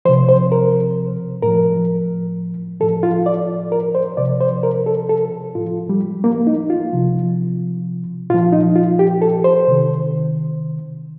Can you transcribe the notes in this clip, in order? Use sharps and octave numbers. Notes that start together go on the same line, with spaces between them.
C3 F3 C5
C5
A#4
A2 F3 A#4
A2 F3 A4
F4
D5
A#4
C5
C3 F3 D5
C5
A#4
A4
A4
A2 F3 F4
G3
A#3
D#4
F4
C3 F3
A#2 F3 F4
D#4
F4
G4
A4
C5
C3 D#3